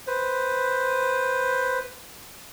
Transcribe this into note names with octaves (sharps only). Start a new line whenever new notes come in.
B4 C5